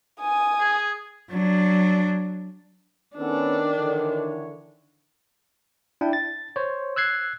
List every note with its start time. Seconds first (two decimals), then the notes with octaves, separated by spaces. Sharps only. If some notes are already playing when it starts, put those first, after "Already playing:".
0.21 G#5 D#6
0.60 G#4
1.30 F#3 D4
3.17 D#3 B3 C#4 D4 A4
3.75 D3 E3 C#5
6.01 D4 E4 G5
6.13 A6
6.56 C5 C#5
6.96 E6 F#6 G#6 C7